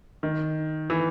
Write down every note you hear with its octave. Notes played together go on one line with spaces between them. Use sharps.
D#3
E3